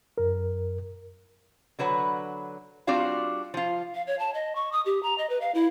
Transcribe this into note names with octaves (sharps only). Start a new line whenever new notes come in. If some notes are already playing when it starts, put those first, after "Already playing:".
F#2 A#4
D3 F#3 B4 F#5
G3 C4 D4 F4 F#4 F5
F3 F4
F5
C#5
A5
D#5
C#6
D#6
G4
A#5
D#5
B4
F5
E4